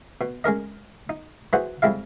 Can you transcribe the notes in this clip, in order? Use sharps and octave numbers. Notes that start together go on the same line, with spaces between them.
B2
G#3 C#4 A#4 D#5
D#4
E3 F#3 F#4 G#4 C5 F#5
F2 G3 G#3 E4 F5